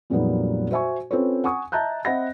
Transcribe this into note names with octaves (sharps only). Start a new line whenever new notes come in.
F2 A#2 F#3 G3 B3 D#4
F#4 C5 E5 G#5 C#6
C4 C#4 F4 A4 B4 C#5
F#5 G#5 C#6 D#6
D#5 E5 A5 A#5 F#6 G6
C4 D#5 E5 F#5 B5 A#6